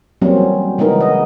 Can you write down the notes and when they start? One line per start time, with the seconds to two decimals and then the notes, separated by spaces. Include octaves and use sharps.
0.21 E3 F#3 G3 A#3 C4 C#4
0.78 C#3 E3 G#3 B3 D#4 A#4
1.01 D#5